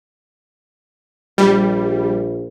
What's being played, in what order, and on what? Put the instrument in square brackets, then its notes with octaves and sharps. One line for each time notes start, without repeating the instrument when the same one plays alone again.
[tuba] A#1 [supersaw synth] G3